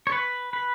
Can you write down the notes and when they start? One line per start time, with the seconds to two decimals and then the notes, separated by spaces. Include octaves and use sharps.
0.07 C#5
0.12 B4
0.53 B4